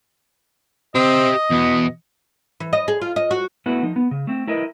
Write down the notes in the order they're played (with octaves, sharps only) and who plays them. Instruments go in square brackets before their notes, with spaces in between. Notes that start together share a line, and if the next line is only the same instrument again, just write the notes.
[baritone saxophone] C4 [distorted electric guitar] G4 E5 [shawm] D#5
[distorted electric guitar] E2 B3 [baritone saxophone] B2
[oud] E3
D#5
G#4
F4
D#5
F#4
[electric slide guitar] A3 B3 E4 F#4 B4 F#5
F3 D#4
B3
C#3
A3 C4
E4 A#4 B4 D#5